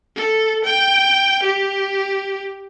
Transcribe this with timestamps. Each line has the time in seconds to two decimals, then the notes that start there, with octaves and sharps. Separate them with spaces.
0.16 A4
0.65 G5
1.43 G4